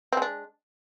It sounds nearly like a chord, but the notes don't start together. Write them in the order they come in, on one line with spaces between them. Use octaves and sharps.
C4 G#3 D4